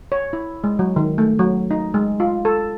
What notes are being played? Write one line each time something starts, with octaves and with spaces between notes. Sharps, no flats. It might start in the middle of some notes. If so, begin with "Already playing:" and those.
C#5
E4
G#3
F#3
D#3
A3
F#3
D#4
G#3
F4
A4